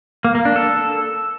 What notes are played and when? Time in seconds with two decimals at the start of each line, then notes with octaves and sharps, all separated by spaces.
0.25 A#3
0.35 A#3
0.45 D4
0.56 A4